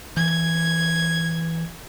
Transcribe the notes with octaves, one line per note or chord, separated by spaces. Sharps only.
E3 G#6